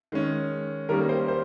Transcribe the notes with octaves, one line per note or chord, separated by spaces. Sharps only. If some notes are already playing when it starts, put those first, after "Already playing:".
D#3 G#3 C#4
D#3 G3 A#3 C#4 A#4
A#4
C5
C5